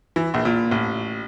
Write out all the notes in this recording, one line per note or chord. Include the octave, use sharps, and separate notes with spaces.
E3
A#1
A#2
A1